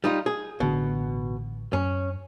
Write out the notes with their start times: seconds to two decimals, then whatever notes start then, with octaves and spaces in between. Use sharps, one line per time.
0.04 G3 D#4 F4
0.26 G#4
0.60 A1 B2 D3 D4
1.73 F#2 C#4